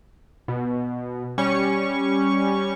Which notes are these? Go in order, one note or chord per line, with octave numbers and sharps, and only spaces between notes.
B2
G3 C#4 C#6